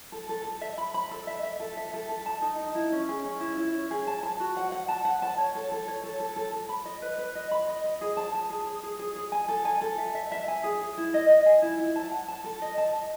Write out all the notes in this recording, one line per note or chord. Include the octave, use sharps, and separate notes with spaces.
A4
A4
A4
E5
B5
B5
A4
E5
E5
A4
E5
A4
A4
A5
D#4
D#4
E4
C#4
G#4
C#4
E4
E4
C#4
G#4
A5
A5
F#4
F#5
F#5
A5
F#5
A5
C#5
A4
A4
C#5
A4
A4
A4
A4
B5
D#5
B4
B4
D#5
B5
D#5
D#5
G#4
A5
A5
G#4
G#4
G#4
G#4
G#4
G#5
A4
G#5
A4
E5
E5
E5
G#5
G#4
G#4
E4
D#5
D#5
G#5
E4
E4
A5
F#5
A5
A4
D#5
A5
D#5